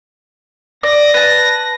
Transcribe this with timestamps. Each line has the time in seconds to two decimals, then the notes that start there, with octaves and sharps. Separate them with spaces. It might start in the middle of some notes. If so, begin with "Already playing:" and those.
0.83 D5 A#6
1.14 B4 A5